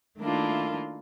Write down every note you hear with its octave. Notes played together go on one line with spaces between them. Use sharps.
D#3 A3 A#3 D4 E4 F4